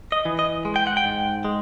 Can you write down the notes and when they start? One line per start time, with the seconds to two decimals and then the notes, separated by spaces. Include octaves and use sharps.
0.12 D#5
0.25 E3
0.39 D#5
0.65 G#3
0.76 G5
0.87 F#5
0.97 G5
1.05 G#2
1.45 G#3